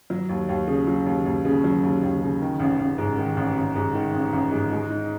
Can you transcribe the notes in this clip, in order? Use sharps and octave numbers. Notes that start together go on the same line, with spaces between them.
F#3
D#2
D#2
C#3
F#3
D#2
D#2
C#3
F#3
D#2
D#2
C#3
D#3
A1
A1
G#2
D#3
A1
A1
G#2
D#3
A1
A1
G#2
G#3
D#4